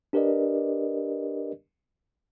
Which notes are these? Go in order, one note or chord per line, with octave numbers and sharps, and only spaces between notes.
D4 G4 A#4 B4 D5 D#5